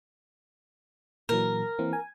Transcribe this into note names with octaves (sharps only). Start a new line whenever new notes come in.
A#2 E3 F#3 A#4
E3 A#3 C4
G#5